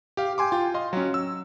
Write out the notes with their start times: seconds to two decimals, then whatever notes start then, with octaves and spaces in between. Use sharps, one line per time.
0.17 G4 F5
0.38 G5 G#5 C6 D6
0.52 F4 G5
0.74 D#5 F5 C6
0.93 F#3 C#4
1.14 E6